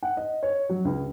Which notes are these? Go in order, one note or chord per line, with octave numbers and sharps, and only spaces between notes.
F#5
D#5
C#5
F#3
C#2